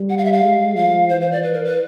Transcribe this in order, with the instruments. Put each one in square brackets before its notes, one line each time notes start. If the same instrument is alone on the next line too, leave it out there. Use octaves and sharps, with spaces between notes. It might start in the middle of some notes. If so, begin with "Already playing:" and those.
Already playing: [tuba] G3
[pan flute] F#5
F5
E5
F5
[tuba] G#3
[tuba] F3 [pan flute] F5
[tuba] E3 [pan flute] C5
[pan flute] C5
D5
B4
A#4
B4